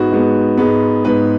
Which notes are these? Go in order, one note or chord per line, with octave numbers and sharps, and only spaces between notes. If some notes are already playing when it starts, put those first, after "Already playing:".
Already playing: G#2 G#3 B3 F#4
G#2 G#3 B3
G#2 G#3 B3
G#2 G#3 B3 B4